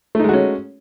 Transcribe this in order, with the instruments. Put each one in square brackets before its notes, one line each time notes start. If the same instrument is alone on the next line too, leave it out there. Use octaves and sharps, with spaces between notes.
[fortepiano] A3
D#4
G#3
F#4
C#4